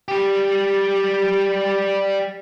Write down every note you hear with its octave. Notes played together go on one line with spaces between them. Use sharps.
G3 G4